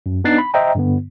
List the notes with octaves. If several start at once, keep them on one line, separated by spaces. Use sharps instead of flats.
F#2
B3 D4 D#4 F#6 A6 C7
B5
C5 D#5 E5 G5 A#5
G2 D3 B3